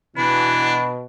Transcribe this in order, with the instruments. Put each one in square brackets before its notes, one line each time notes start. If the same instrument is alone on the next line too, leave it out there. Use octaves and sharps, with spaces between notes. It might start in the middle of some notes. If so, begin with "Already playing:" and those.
[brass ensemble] B2 [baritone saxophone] E3 [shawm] D4 [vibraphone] B5